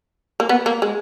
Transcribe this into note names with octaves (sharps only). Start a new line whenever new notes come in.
A#3
B3
A#3
G#3